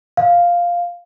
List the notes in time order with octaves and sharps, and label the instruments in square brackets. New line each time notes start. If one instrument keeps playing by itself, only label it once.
[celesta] F5